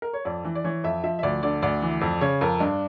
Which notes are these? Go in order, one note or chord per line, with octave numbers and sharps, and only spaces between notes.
A#4
C#5
F2 D5
E3
D5
E3 C#5
F2 E5
F3 E5
E5
D2 D5
D3 D5
D2 D5
E3
F2
C#3 C#5
F2 A#4
G2 D4